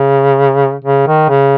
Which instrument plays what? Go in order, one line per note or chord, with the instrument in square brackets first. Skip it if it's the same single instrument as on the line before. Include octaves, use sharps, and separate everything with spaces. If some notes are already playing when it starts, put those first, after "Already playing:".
Already playing: [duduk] C#3
C#3
D#3
C#3